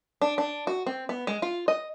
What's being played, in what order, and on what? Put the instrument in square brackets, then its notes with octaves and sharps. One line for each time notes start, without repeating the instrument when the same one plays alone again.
[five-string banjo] D4
D4
F#4
C4
B3
G#3
F4
D#5